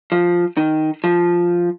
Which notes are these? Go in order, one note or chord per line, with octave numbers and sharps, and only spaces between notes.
F3
D#3
F3